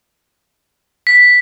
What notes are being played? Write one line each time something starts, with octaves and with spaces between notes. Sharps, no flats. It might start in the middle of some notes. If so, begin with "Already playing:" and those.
B6